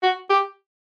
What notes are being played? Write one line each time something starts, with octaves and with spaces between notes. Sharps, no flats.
F#4
G4